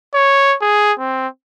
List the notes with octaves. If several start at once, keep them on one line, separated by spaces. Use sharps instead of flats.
C#5
G#4
C4